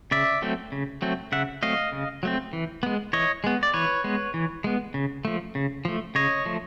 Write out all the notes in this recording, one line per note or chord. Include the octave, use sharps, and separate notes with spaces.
C#3 D5 E5
F#3 A3 C4
C#3
F#3 A3 C4
C#3 E5 F#5
F#3 A3 C4 D#5 F5
C#3
F#3 A3 C4
E3
G#3 B3
E3 C#5 D#5
G#3 B3
D5
E3 B4 C#5
G#3 B3
E3
G#3 B3
C#3
F3 A3
C#3
F3 A3
C#3 C#5 D#5
F3 A3